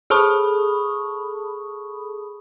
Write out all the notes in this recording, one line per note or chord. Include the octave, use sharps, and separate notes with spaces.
G#4 A4 A5 B5 C#6 D#6